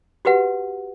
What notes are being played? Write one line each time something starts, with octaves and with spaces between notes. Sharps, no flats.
F#4 G4 B4 F#5